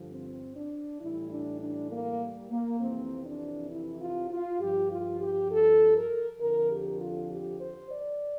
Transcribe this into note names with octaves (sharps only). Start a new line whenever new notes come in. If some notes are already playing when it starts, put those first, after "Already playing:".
Already playing: G2 D3 F3
C4
D4
A2 E3 G3 E4
D4
D4
A#3
A#3
F2 C3 E3 C4
D4
E4
F4
F4
G2 F3 G4
F4
G4
A4
A#4
F2 D3 F3 A#4
G4
F4
G4
C5
D5